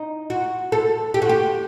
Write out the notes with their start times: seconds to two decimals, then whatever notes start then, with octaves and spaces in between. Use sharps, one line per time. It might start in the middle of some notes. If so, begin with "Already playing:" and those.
Already playing: D#4
0.30 F#4
0.72 A4
1.14 G4
1.22 F#4
1.29 G4